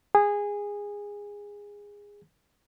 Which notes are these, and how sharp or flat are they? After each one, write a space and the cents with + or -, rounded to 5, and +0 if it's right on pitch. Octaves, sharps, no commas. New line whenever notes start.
G#4 -20